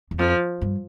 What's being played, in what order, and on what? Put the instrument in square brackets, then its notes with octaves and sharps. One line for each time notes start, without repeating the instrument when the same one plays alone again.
[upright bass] E2
[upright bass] F2 [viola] F3
[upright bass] G2